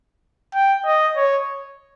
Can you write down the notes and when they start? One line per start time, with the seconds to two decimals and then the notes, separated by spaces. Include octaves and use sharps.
0.55 G5
0.86 D#5
1.16 C#5